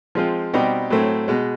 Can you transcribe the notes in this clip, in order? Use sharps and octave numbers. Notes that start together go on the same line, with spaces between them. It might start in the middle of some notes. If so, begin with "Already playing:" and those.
F3 G#3 C4 F4
B2 G3 C4 D#4 G4
A2 F#3 A3 C4
B2 G#3